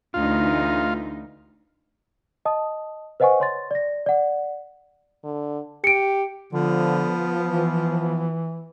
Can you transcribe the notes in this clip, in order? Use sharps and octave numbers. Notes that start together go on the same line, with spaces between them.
D2 E3 D#4 F4
D#5 A5 D#6
B4 C5 D#5 F#5 G#5 C#6
C#5 C6 A6
D5 A#6
D5 F#5
D3
G4 C#7 D7
D3 F3 B3
E3